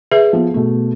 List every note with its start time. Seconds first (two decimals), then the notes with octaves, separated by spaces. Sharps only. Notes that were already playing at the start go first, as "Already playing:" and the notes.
0.12 G#4 B4 E5
0.33 F3 B3
0.54 B2 A3